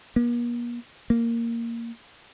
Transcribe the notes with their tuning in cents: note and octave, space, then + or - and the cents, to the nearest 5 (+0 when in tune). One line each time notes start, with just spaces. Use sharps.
A#3 +45
A#3 -5